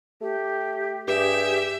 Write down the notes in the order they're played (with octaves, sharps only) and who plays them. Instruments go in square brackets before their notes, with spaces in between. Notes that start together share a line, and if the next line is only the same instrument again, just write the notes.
[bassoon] A3 [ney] G4
[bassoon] G2 [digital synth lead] G4 [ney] G#4 [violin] E5